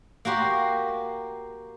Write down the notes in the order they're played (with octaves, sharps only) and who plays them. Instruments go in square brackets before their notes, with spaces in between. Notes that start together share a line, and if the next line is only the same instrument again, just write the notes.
[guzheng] A#3 F#4 G4 C6